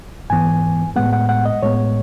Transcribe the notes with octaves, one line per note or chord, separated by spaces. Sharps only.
G#2 E3 B3 G#5
A2 G#3 B3 F#5
F#5
F#5
D#5
A2 G#3 B3 C#5